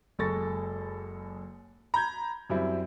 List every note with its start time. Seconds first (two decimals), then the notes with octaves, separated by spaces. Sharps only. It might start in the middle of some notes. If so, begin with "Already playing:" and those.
0.19 F#1 G#3 A4 C#6 A6 A#6
1.94 A#5 B5 G6 G#6
2.50 F#2 G3 C4 E4